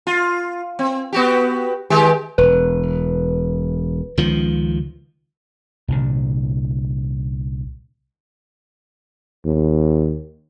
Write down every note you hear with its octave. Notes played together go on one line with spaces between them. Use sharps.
F4
C4
B3 F#4 G4
D#3 G#3 G4
E1 B4
C#2 D#3 F3
C2 A#2 D3
D#2